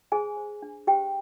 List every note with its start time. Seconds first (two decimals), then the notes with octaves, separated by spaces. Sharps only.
0.12 G#4 C5 G#5
0.37 C5
0.62 D4
0.87 G4 C5 G5